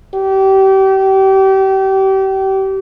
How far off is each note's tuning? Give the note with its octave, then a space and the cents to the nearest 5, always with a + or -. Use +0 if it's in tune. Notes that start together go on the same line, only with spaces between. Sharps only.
G4 -30